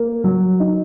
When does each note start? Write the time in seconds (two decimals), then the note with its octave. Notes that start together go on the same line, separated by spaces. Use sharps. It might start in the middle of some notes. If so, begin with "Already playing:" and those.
Already playing: A#3
0.24 F#3
0.60 D#4